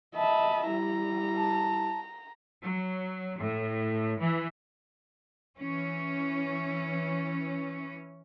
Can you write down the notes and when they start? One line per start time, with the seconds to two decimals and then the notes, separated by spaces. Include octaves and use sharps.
0.15 D#5 E5 A5 B5
0.68 G3 E4 A#5
1.37 A5
2.64 F#3
3.38 A2
4.20 E3
5.59 E3 C#4